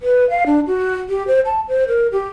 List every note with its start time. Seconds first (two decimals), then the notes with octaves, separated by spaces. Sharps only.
0.01 B4
0.30 F5
0.46 D4
0.67 F#4
1.09 G4
1.27 C5
1.46 A5
1.68 C5
1.88 A#4
2.12 G4